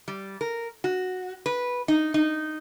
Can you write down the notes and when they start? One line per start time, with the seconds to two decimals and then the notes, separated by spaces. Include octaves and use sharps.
0.08 G3
0.41 A#4
0.84 F#4
1.46 B4
1.88 D#4
2.14 D#4